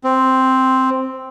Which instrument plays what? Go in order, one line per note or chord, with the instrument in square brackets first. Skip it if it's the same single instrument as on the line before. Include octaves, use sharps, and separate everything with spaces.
[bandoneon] C4